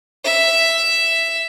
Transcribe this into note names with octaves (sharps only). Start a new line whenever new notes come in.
E5